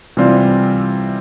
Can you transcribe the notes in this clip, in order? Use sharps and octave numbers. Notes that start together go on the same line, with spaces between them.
C3 E3 G3 C4 F4